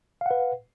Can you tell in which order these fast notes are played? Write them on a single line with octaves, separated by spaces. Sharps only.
F5 F#5 B4